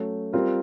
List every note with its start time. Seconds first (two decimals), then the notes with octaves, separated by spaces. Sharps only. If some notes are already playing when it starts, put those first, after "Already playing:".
Already playing: F#3 A3 C#4
0.33 G3 C4 F4 A#4